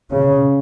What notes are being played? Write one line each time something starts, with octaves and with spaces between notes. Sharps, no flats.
C#3